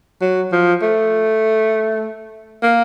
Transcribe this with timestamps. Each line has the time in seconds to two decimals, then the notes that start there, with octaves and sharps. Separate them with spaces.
0.21 F#3
0.52 F3
0.82 A3
2.63 A#3